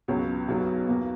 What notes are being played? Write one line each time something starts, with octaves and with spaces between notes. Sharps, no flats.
C#2 B2 F#3 C#4
B1 B2 F#3 B3 D#4
E2 B2 A#3